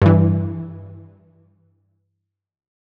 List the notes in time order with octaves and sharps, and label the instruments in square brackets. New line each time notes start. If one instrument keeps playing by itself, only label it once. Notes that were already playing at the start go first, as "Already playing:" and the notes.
[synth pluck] G2 E3